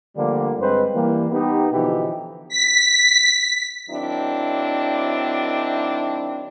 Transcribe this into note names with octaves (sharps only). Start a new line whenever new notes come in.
D3 F3 G3 A3 A#3 D4
G2 G#3 C4 B4 C5
E3 G3 A#3
B3 D#4 G4
B2 D3 E3 F3 D#4 G4
B6
D#3 F#3 C4 D4 E4